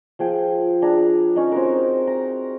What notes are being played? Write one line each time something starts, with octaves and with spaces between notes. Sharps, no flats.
F3 G#4 G5
D4 G#4 A#5
C#4 D#4
C4 F#4 A#4
A#5